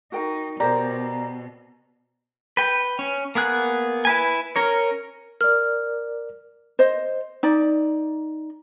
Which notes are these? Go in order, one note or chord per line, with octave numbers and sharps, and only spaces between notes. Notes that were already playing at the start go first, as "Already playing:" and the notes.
D#4 F#4 A#4 G5
B2 G4 A#4 C5 D5 A#5
B4 G5
C#4
A#3 B3 G#4 F#6
E4 B4 G#5
C#4 A#4 C#5
A#4 D5 F6
C5 D#5
D#4 D5